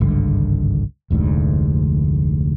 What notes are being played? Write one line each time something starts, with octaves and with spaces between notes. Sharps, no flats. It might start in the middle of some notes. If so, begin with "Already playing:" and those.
G#1 C#2 G2 D3
F1 D2 G#2 D3